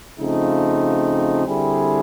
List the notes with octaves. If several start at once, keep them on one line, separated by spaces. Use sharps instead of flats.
C#3 F3 A3 C4 D#4
D3 G3 C4 E4 G#4